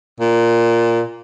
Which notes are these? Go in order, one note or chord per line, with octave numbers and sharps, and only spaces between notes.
A#2